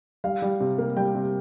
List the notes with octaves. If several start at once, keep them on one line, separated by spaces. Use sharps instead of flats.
G3 F5
G3
C3
A#3
G3 G5
C3